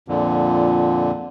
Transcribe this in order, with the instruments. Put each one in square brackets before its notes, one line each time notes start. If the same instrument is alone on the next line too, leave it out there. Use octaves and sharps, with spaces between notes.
[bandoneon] F2 A#2 D3